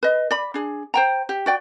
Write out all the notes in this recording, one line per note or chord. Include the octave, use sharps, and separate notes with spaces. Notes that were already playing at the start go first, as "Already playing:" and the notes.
B4 D#5
D5 B5
D4 G#4
C5 G5 A#5
G4
F#4 D5 G5